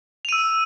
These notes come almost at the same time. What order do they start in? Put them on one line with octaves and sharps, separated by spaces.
F7 D#7 E6